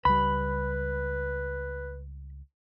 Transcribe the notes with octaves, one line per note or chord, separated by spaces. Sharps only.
C#2 G3 B4 B5